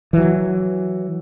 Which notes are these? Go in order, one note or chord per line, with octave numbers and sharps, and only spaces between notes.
E3 F#3